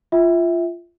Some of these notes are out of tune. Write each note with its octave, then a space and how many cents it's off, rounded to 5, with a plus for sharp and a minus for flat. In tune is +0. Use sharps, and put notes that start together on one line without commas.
F4 -15 E5 -15 G5 +0